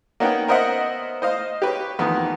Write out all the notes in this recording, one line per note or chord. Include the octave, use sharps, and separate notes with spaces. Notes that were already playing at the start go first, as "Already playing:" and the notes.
A#3 B3 C#4 D#4 F#5 G5
B3 A#4 C5 D#5 E5 F#5
C5 D#5 F5
G4 B4 C#5
F2 D#3 E3 B3